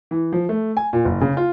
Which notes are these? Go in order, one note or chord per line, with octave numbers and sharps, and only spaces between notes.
E3
F3
A3
G#5
A#2
F#1
C#3
F4